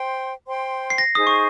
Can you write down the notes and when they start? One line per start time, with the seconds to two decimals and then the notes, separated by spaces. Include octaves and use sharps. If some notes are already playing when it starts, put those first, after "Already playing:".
Already playing: C5 G5 C6
0.47 C5 G5 C6
0.90 C7
0.98 A#6
1.15 D#4 G#4 C5 D#6
1.27 C#6